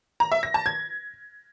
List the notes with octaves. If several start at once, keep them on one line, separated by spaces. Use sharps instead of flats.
A#5
E5
A#6
A5
G#6